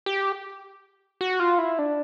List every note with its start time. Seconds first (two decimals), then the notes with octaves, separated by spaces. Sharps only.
0.06 G4
1.21 F#4
1.40 F4
1.59 E4
1.78 D4